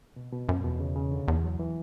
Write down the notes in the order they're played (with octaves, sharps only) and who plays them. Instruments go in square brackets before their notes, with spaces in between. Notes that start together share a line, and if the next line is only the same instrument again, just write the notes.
[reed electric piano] B2
B2
[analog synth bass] F#2 [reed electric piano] A#2
[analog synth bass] E2 [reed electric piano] B2
[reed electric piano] C#3
C#3
D3
[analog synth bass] E2 [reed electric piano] E3
[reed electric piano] F#3
E3